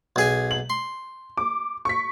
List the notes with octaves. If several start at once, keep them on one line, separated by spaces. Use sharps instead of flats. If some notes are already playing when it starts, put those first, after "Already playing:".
B1 G#4 G#5
F#7
C6
D6
C#6 B6